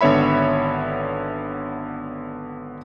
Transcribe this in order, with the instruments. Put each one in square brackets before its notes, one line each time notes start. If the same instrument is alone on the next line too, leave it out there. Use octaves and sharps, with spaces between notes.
[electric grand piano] G#1 D3 B3 C#5 E5 B5